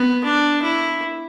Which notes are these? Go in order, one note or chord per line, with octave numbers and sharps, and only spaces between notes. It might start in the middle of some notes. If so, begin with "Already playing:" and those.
Already playing: B3
D4
E4